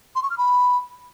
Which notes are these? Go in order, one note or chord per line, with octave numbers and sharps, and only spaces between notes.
C6
C#6
F6
B5